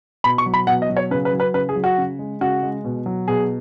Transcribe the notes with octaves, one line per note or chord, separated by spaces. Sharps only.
B2 B5
C#6
F#3
B5
B2 F#5
D#5
F#3
C#5
C#3 B4
B4
F#3
B4
C#3 B4
G#4
F#3
F#4
C#3
G#3
C#3 F#4
G#3
B2
F#3
B2 G#4